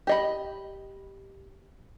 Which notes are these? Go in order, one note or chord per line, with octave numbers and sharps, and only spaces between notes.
G4 D#5 B5